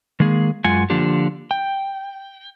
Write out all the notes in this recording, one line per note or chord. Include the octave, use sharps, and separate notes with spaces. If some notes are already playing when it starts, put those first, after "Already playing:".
D#3 G#3 A#3 G#4
F#2 G#3 F4 F#5 G#5
D3 F3 A#3 D4 F4 G4
G5